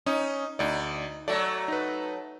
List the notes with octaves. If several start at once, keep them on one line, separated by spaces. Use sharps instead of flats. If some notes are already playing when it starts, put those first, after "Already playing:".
C#4 D#4 D#6
D2 D#4 D5
F#3 A3 D5
D#4 B4